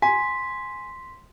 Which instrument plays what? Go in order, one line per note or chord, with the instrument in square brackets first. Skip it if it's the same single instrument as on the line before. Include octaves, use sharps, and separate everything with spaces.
[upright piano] G#5 [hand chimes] C6 B6